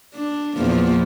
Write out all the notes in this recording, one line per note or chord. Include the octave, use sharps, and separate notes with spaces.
D4
E2 A#2 F3